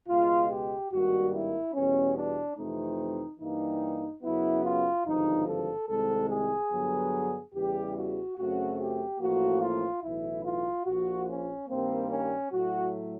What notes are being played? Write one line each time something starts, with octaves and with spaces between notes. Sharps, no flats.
C#2 B2 G#3 F4
G4
G#1 G2 D#3 G3 A#3 F#4
E4
E2 B2 G3 B3 C#4
D4
F2 C3 E3 A3 C4 D#4
G2 E3 G3 A#3 D#4
F#2 C#3 F#3 B3 E4
F4
G#1 G2 D3 F3 D#4
A4
C2 C3 D#3 G#3 C4 A4
G#4
G2 D3 F#3 B3
E2 C#3 E3 G3 G4
F#4
F#2 C#3 F#3 A3 C4 F#4
G4
A1 A2 F3 A#3 F#4
F4
B1 A2 E3 E4
F4
A#1 A#2 F3 F#4
C#4
G2 D#3 G3 A#3 C4
C#4
A2 F#3 A3 F#4